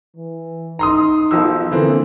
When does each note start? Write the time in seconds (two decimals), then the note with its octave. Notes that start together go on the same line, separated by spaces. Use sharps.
0.16 E3
0.79 D#4 A#5 C6 D#6
1.31 B1 F3 E6
1.71 D3 E3 A#3 C4